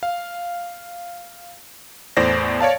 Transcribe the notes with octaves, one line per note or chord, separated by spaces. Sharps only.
F5
E2 A2 C5 D5 A#6
C#5 D5 F5 A5